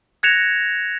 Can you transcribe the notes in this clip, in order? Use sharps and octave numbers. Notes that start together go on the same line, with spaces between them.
F#6 G#6 A#6 C#7 E7 F7